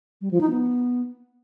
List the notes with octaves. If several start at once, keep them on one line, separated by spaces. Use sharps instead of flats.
G3
F3
D#4
B3